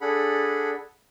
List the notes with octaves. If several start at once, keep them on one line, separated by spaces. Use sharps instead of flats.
D4 G#4 A4 F#5 B5